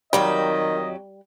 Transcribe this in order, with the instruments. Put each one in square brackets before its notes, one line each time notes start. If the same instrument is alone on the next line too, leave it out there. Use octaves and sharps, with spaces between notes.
[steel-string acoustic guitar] F2 F#3 G4 [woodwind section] D#3 [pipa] G3 [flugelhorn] D#5